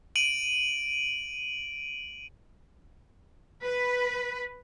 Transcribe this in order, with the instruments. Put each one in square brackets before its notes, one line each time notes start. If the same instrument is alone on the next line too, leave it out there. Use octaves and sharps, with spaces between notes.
[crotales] D7 D#7 F#7
[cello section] B4